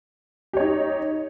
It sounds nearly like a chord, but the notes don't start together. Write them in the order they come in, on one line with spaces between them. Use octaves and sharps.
G4 C#5 D#4